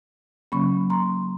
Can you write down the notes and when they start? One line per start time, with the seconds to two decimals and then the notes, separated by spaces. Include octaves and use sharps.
0.52 C#3 F#3 A#3 C#4 B5 C#6
0.90 A#5 C6